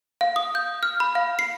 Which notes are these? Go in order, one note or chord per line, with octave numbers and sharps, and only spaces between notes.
F5
D#6
G6
F6
B5
F5
C7